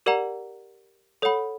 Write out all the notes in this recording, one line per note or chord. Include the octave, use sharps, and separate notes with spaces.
G4 A#4 D5 F#5 A#5
A4 C#5 F#5 B5